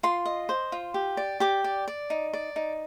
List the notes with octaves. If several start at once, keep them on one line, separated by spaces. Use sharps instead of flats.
F4 C6
D#5
C5
F4
G4
D5
G4 D6
D5
D5
D#4
D5
D#4